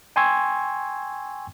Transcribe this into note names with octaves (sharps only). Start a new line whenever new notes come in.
G5 G#5 C6 C#6 E6 G#6